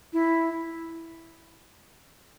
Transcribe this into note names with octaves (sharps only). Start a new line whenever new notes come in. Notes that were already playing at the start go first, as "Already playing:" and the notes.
E4